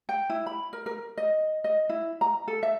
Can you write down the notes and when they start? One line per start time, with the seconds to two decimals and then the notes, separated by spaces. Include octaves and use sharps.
0.09 G5
0.30 E4
0.46 B5
0.73 A#4
0.86 A#4
1.17 D#5
1.64 D#5
1.89 E4
2.21 A#5
2.48 A4
2.63 E5